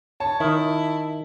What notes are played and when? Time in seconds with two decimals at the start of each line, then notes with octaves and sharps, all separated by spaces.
0.20 C#5 A5
0.40 D#3 E4